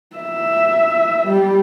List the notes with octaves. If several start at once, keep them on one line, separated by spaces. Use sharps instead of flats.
E5
G3